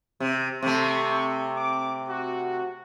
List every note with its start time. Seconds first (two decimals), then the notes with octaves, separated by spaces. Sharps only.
0.20 C3
0.63 C3 A3 C6 C#6
1.57 D6
2.08 F#4